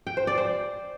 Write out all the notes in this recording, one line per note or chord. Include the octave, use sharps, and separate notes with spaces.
G5
C5
D5
C5